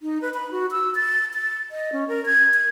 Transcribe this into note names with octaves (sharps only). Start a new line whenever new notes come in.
D#4
B4
B5
F#4
E6
A6
A6
D#5
C#4
A#4
G#6
G#6